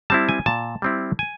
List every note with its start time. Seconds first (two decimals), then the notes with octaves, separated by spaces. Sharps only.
0.10 G3 C4 E4 A5
0.29 G#5
0.46 A#2 A5
0.82 G3 C4 E4
1.19 G#5